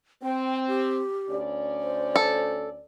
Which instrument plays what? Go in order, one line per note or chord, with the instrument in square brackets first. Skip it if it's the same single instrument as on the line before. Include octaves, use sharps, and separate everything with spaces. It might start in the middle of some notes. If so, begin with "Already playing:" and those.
[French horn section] C4 [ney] G5
[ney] G4
[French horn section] D2 C#4 D5
[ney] C5
[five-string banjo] A4